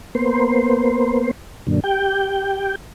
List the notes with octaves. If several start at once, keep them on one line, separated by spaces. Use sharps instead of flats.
A#3 B3 C5
F#2 A#2 D3
G4 G5